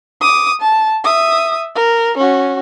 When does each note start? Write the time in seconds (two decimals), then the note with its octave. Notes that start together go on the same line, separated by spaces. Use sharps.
0.21 D6 D#6
0.61 A5
1.04 E5 D#6
1.75 A#4
2.17 C#4 F#4